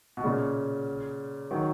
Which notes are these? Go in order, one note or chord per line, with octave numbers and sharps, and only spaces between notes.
B2
A#2 C#3
D#3 F#3